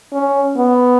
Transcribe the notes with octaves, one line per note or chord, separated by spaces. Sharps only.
C#4
B3